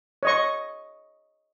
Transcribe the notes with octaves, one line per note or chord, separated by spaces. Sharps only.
C#5 D#5 C#6